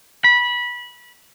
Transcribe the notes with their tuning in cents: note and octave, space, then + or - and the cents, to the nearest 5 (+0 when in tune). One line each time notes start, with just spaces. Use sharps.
B5 -20